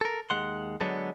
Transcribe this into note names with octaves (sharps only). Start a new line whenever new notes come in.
A4 A#4
D#2 G#3 F#5 C6
D3 F#3 G#3 B3 A4